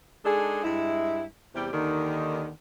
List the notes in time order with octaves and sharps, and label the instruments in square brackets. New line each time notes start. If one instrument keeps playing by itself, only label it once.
[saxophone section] G#3 D4 D#4 G#4 A4
G2 G#3 E4
E2 C3 G3 G4
D#2 D3 D#3